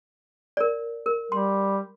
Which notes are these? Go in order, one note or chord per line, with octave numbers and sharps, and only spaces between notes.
A#4 D5
A#4
G3 C6